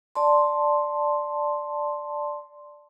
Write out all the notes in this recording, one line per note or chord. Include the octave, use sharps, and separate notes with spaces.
D5 A5 C6